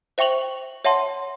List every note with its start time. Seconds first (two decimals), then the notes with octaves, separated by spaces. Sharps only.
0.18 C5 E5 G5 C#6 F7 F#7
0.85 C#5 E5 F#5 A5 C6